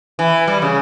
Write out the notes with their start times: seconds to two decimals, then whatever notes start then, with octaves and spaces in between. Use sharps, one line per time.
0.19 E3
0.48 G3
0.62 C#3